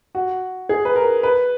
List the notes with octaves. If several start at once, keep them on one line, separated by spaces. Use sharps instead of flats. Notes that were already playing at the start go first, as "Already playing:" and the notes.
F#4
G#4
B4
A#4
B4